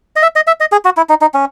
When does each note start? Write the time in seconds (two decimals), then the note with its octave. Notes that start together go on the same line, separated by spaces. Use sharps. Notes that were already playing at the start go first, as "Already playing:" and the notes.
0.16 D#5
0.22 E5
0.36 D#5
0.47 E5
0.60 D#5
0.72 G#4
0.85 F#4
0.97 E4
1.09 D#4
1.21 D#4
1.34 C#4